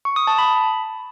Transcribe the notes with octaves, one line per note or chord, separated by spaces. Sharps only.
C#6
D#6
A5
B5